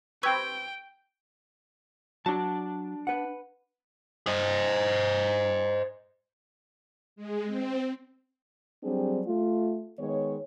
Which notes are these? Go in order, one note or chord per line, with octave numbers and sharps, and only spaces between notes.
C4 G4 B4 G5 C#6 E6 G#6
F#3 D4 F#4 A5
B4 F#5
C5 D#5
G#3
C4
F#3 G3 C4 D4 G4 G#4
A3 F4
D#3 G#3 B3 C#5